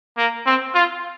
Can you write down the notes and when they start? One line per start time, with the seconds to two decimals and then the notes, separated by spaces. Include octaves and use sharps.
0.18 A#3
0.46 C4
0.74 F4